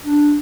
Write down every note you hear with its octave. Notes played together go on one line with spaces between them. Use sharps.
D4